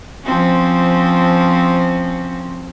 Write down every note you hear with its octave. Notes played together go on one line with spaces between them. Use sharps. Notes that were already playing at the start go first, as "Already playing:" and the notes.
F3 C4 C#4